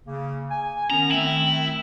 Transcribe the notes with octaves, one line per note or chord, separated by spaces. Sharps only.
C#3 A#3
G#5
D#3 B3 C#4 A#5
D#3 A3 C4 E4